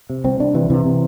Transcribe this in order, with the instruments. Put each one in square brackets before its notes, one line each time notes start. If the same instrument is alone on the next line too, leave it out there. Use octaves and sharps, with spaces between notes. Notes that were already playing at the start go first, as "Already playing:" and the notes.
[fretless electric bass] C3
C2 C4
C2 D4
C3 E3
C3 E3
C3